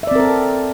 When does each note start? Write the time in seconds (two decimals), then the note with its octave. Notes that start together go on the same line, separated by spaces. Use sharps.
0.03 E5
0.07 D5
0.11 C4
0.16 A#4
0.20 A4